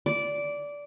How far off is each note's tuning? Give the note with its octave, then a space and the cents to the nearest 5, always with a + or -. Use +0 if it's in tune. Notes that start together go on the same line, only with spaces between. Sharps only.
D5 -15